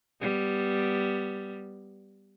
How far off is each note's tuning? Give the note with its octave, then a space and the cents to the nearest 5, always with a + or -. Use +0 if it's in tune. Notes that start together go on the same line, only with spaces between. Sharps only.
G3 +0 B3 +0